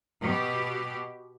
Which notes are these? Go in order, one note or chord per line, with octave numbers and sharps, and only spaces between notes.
B2 G4